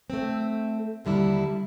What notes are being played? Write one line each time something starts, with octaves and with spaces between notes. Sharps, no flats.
A3 C4
D#2 D3 G3 E4